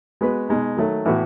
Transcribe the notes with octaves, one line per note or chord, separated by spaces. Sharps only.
G#3 B3 F#4 B4
B2 G#3 D#4
D#3 F#3 A3
A2 E3 B3 F#4